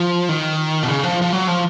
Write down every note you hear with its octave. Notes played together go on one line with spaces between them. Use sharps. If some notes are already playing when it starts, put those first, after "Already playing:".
Already playing: F3
D#3
B2
C#3
F3
F3
F#3
F3